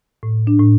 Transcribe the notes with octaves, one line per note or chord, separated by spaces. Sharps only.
A2
D4
A2